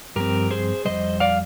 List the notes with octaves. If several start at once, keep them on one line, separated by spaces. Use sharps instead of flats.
G2 F3 C4 G4 A#4
G#4 C5
F2 D#3 G3 C5 D#5
D5 F5